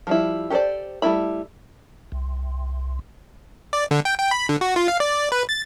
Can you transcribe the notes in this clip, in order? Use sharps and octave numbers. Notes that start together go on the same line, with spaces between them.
F3 G3 E4
G4 A4 B4 C5 D5
G3 A3 C4 E4 B5
C2
D5
D3
G5
G5
B5
D3
F#4
F4
F5
D5
B4
A6